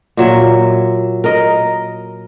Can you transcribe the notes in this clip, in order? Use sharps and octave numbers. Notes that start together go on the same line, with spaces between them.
A#2 F#3 E5
A#4 D#5